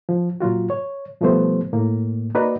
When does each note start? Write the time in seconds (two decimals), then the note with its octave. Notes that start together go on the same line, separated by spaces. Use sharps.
0.09 F3
0.40 A#2 F#3 F4 F#4
0.70 C#5
1.21 B2 F3 G3 A3 B3 C5
1.73 A2 A#3
2.34 A#3 D#4 F#4 B4 D5